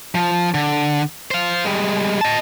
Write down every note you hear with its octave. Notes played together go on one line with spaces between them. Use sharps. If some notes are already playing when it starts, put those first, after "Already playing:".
F3
D3
C5 F5
G3 G#3
D#5 A5